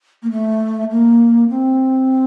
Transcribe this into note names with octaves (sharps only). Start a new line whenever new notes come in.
A#3
A3
A#3
C4